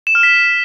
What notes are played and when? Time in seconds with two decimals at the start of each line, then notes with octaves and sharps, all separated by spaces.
0.07 E7
0.15 F6
0.23 B6